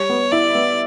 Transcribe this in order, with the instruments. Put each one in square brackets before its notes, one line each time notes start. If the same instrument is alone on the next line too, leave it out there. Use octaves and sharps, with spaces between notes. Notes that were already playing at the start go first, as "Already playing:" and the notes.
Already playing: [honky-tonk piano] G3 [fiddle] C#5
[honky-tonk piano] B3
[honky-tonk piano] E4 [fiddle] D5
[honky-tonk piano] B3